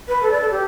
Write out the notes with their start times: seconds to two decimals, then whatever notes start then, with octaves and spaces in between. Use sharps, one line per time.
0.08 B4
0.23 A4
0.31 D5
0.41 A4
0.51 G4